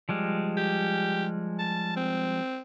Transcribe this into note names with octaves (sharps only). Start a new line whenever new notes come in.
F3 G3 G#3
G4
A5
C4